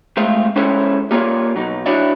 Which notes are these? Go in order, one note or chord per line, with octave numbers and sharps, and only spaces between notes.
G#3 A3 C4 F4 C5 E5
G#3 C#4 E4 A4 C5 C#5
G3 A#3 F4 C#5 D5
B2 F#3 D#4
D4 E4 F#4 C#5 D5 E5